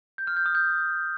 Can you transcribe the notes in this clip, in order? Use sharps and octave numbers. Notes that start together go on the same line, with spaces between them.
G6
F6
G6
D#6
G6